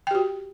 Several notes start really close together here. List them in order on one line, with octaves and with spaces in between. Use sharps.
G5 G4 F#4